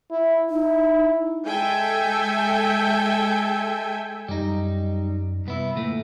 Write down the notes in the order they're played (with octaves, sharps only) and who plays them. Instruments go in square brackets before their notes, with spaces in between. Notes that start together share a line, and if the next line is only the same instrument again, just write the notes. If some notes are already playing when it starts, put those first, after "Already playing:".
[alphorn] E4
[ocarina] D#4 [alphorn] E4
[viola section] G#3 A4 E5 G5 G#5
[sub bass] F#2 [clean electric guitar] G3 D#4
[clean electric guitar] C2 B3 E4
D2 A#2 A3